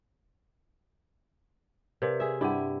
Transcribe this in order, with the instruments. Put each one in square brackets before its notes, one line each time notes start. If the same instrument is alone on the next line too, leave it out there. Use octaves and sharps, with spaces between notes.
[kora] C3 [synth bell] A#4 B4 D5
[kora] G#4 E5
[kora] G2 E4 G4 [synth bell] D4 F#5